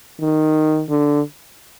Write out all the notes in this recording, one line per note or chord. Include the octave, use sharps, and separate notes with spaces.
D#3
D3